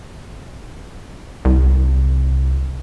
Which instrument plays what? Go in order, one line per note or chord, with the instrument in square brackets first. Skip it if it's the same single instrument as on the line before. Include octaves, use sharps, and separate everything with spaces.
[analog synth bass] C2